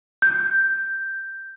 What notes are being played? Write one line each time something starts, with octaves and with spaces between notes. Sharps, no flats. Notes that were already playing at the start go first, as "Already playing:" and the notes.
G6